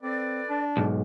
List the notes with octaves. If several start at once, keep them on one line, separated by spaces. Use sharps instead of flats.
C4 A4 B4 D5
D4
B1 G#2